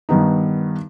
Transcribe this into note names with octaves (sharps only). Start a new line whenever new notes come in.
G2 D#3 B3 D#4